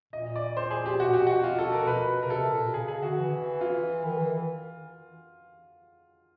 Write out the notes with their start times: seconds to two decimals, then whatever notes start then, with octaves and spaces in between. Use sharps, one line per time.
0.13 A#2 D#5
0.36 D5
0.57 C5
0.71 G#4
0.86 G4
1.00 B2 F#4
1.13 G4
1.27 F#4
1.43 F4
1.59 A4
1.73 A#4
1.87 B2 B4
2.23 C#3 A#4
2.30 C3 A4
2.52 A#2
2.63 B2
2.74 C#3 G#4
2.88 C#3 G#4
3.02 D3 F#4
3.17 E3
3.61 F4
4.05 D#3
4.17 E3